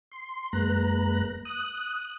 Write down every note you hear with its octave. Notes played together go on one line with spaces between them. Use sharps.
C6
F#2 G#3 A#3 B4 A#5 F#6
D#6 F#6